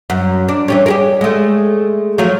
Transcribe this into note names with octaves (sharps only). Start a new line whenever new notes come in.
F#2
D4
E3 G3 C#4
G4 G#4 A#4
G#3 A3
F3 F#3 A3